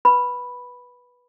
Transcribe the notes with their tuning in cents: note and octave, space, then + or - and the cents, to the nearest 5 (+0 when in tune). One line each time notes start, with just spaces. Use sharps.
B4 -10 B5 +0